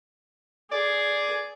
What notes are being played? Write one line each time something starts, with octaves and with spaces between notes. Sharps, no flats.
G#4 D5